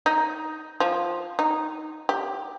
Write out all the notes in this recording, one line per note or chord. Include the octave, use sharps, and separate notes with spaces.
D#4
F3
D#4
G4